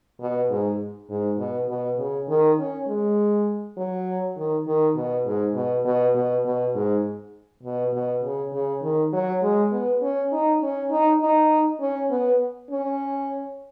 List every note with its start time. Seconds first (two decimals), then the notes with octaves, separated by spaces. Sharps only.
0.20 B2
0.50 G#2
1.10 G#2
1.39 B2
1.69 B2
1.98 C#3
2.29 D#3
2.59 C#4
2.87 G#3
3.77 F#3
4.37 D#3
4.67 D#3
4.96 B2
5.26 G#2
5.55 B2
5.85 B2
6.15 B2
6.45 B2
6.75 G#2
7.63 B2
7.93 B2
8.24 C#3
8.53 C#3
8.83 D#3
9.13 F#3
9.42 G#3
9.72 B3
10.02 C#4
10.32 D#4
10.62 C#4
10.91 D#4
11.21 D#4
11.80 C#4
12.10 B3
12.70 C#4